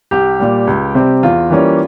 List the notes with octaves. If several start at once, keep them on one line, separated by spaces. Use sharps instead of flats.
C2 G4
A#2 G3
C#2
C3 G3 C4
E2 F4
E3 G3 A#3 C#4